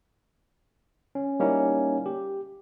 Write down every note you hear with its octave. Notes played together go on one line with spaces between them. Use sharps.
C#4
G3 A#3 C#4 D#4 E4
G4